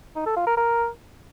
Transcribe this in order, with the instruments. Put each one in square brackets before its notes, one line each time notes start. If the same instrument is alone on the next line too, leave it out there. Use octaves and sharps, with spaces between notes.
[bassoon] D#4
A4
F4
A#4
A#4